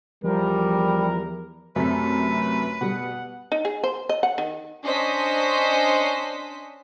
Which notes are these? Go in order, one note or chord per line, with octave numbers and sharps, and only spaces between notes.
E2 F3 G3 A#4
F#2 C3 A3 B4 B6
B2 G3 F#5
D#4
G#4
C5
D#5
F#5
D#3
C#4 D4 C5 D#5 B6